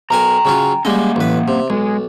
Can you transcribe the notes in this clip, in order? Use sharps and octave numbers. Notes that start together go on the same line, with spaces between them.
B1 A#4 G5 G#5 A#5
C#3 F#3 F4
G3 G#3 A#3 C#4 D#5
A1 B4
C3
B1 G#3